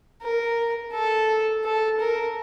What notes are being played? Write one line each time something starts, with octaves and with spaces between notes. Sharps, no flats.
A#4
A4
A4
A#4